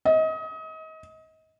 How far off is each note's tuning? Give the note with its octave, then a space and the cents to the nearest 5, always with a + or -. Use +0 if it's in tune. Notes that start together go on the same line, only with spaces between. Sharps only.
D#5 +30